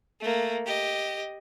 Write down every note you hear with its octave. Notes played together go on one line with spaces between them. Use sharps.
A3 A#3
G4 D#5